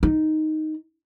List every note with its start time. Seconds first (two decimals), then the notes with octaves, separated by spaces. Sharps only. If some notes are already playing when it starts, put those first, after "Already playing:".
0.03 D#4